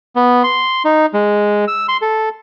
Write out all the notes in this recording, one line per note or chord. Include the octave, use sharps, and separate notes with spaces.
B3
C6
D#4
G#3
E6
C6
A4